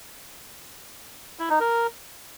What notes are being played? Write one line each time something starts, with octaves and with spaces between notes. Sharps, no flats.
E4
D#4
A#4